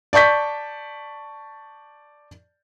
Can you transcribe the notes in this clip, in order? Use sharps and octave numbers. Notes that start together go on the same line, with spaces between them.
D5 A5 C#6 G6 B6